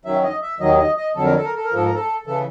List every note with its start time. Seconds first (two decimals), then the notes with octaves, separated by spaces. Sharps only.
0.05 F#2 D#3 F#3 E5
0.23 D#5
0.42 E5
0.60 D#2 D#3 F#3 D#5
0.78 D#5
0.97 D#5
1.15 F2 D3 F#3 A4
1.25 A#4
1.36 A4
1.44 A#4
1.56 A4
1.64 A#4
1.71 G#2 F3 A4
1.85 A#4
1.95 A4
2.26 C#3 E3 A4